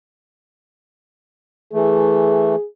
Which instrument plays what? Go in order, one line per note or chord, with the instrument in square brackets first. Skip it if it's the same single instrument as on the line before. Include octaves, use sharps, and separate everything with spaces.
[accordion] E3 A3 [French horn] G#4